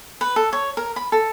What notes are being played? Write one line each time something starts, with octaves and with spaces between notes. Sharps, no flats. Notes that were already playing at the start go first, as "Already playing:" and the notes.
B4
A4
C#5
A#4
B5
A4